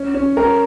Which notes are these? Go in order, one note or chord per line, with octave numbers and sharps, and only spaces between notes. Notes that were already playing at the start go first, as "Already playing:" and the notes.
Already playing: C#4
C#4
C#4 A#4